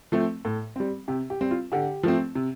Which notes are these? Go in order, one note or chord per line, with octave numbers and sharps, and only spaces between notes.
F3 A3 C4
A2
G3 C4
C3 G4
G4
G3 C4
F4
D3 G4
F3 A3 C4
C3